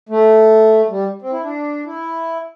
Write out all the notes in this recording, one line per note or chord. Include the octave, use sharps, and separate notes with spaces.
A3
G3
C4
E4
D4
E4